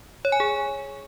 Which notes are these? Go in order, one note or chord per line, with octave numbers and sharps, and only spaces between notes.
C#5
G#5
G#4